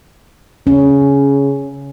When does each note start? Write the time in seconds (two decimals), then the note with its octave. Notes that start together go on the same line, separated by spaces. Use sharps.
0.67 C#3 C#4